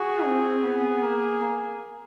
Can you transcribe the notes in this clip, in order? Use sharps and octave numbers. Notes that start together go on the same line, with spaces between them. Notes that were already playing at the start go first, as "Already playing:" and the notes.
Already playing: F#4 G#4
C4
B3
A#3